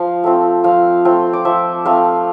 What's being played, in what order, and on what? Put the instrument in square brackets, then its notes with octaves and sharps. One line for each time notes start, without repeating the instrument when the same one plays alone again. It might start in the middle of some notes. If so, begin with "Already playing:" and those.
Already playing: [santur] F3 F5
A3 C4 F4
F3 F5
A3 C4 F4
D5
F3 E5
A3 C4 F4 F5